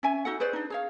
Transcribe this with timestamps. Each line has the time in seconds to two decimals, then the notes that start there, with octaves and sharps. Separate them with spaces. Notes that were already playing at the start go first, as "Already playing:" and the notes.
0.03 C#4 E5 G#5
0.25 D#4 F#4 A4 F#5
0.40 G#4 B4 C5 D5
0.53 D4 D#4
0.70 G#4 C#5 F5